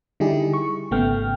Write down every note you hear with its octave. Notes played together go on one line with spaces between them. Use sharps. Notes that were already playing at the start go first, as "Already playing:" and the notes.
D3 G3 D#4 E4 G4 G#4
C#6
G#1 C#3 A3 B3 G5 F6